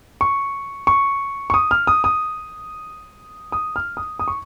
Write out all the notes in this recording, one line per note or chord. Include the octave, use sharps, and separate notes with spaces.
C#6
C#6
C#6
D#6
F6
D#6
D#6
D#6
F6
D#6
D#6
C#6